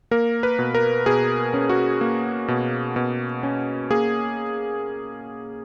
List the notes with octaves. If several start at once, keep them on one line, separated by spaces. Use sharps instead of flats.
A#3 A#4
B4
B2
A#4
B2 G#4
C#4
F#4
A#3
B2
B2
C#4
A#3 G#4